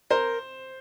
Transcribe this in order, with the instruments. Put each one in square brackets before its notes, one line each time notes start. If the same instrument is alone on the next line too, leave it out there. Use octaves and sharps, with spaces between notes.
[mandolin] A#4 [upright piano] C5